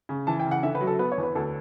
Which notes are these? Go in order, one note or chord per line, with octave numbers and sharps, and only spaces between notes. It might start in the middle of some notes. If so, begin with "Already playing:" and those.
C#3
E3 A5
G5
C#3
F#5
D3 E5
B4
F#3
A4
B3 B4
C#5
E2
B4
D2 A4